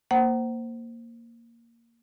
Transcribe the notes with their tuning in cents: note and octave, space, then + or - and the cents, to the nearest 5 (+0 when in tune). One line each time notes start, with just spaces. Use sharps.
A#3 -5 C5 +0 F#5 +35